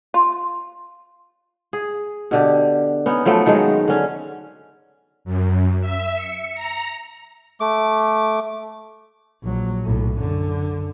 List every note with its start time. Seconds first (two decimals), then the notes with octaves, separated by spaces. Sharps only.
0.14 F4
1.73 G#4
2.31 B2 D3 G4
3.06 B3 C#4 D#4
3.26 F3 F#3 A3 B3
3.46 D#3 F#3 G#3 D#4
3.88 D3 C#4
5.25 F#2
5.81 E5
6.14 C#7
6.55 A#5
7.60 A3 D6
9.43 A#1 F#3
9.84 B1 A2
10.17 F#2 D3